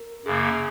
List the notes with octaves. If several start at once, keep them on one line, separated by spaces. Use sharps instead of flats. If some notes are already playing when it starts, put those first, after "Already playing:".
Already playing: A#4
F#2 C#3 A#3 G#4